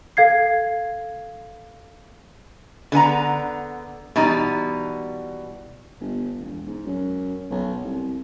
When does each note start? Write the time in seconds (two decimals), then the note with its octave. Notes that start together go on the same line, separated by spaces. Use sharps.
0.17 A4 F5 G#6 C7
2.92 D3 B3 G#5 A#5
4.16 B2 E3 G3 D#4
6.01 G1
6.40 E1
6.67 G#2
6.86 F#2
7.50 B1
7.83 C2